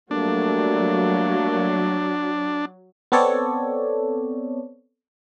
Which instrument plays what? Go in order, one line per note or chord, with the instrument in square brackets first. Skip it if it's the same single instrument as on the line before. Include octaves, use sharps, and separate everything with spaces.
[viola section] F#3 [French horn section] G3 A3 A#3 [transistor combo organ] D4
[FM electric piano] B3 C4 A4 C#5 D5